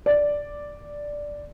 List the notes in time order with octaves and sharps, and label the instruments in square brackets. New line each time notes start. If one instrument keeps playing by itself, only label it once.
[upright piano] D5